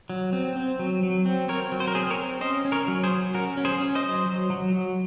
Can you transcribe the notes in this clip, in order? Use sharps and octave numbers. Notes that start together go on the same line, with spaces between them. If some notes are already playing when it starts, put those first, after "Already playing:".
F#3
C4
C4
F#3
F#3
C4
C4 A#4 C#5
F#3
C5
A#4
C4 G#4 C5
A#4 C#5
C4
C#4 C5 D#5
C#4
A#4 C#5
F#3
G#4 C5
F#3
C#4 F#4 A#4
C#4
G#4 C5
C#4
C5 D#5
F#3
F#3
F#3
F#3